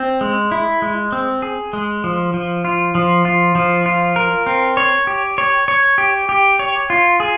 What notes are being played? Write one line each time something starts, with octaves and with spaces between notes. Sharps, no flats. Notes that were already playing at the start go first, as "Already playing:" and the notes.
Already playing: C4
G#3
E4
G#3
C4
G#4
G#3
F3
F3
F4
F3
F4
F3
F4
A#4
C4
C#5
G4
C#5
C#5
G4
G4
C#5
F4
G#4